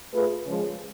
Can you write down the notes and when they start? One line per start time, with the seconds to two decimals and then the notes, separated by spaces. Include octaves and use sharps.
0.13 A3 F4 G#4 B4
0.46 C#3 F3 G#3